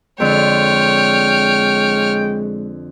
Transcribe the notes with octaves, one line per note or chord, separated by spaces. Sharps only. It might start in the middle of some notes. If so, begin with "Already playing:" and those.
F2 D3 G#3 C#5 G5 F6